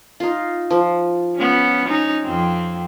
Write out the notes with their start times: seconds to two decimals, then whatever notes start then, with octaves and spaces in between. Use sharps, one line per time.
0.20 D#4 F4
0.70 F3
1.36 B3 C#4
1.87 C#4 D#4
2.24 F2 C4